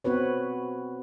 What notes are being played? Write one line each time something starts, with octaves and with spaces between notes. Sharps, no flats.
B3 C4 F#4 B4 C#5